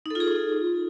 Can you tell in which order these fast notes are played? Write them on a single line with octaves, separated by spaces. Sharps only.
D#4 A4 F4 G#4